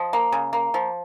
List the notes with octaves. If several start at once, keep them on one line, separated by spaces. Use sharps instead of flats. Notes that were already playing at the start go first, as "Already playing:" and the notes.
Already playing: F3 D#5
A#3
C#3
A#3
F3